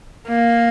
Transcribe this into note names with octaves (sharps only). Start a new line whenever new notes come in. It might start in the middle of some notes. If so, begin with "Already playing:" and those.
A#3